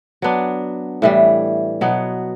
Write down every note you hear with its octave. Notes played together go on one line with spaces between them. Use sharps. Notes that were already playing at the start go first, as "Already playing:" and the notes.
F#3 B3 D4
A2 E3 G3
B2 F#3 B3